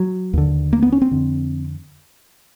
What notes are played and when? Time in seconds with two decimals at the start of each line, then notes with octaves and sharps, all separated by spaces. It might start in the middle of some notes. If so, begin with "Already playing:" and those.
Already playing: F#3
0.33 D#2 D3
0.73 A#3
0.82 B3
0.92 C#4
1.02 C4
1.11 F2 D3